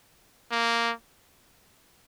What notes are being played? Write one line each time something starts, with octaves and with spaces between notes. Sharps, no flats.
A#3